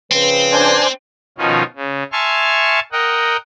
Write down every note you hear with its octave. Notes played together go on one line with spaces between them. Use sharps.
C#3 F3 C4 B4
D4 C5 G#5
B2 D#3 F3 C#4 D#4 F4
C#3
E5 G#5 A5 C6 C#6 F6
A#4 D#5 F#5 G5